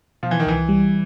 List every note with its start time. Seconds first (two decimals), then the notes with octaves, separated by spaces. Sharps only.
0.23 B2 F3
0.31 E3
0.40 D#3
0.46 C2 E3
0.69 G3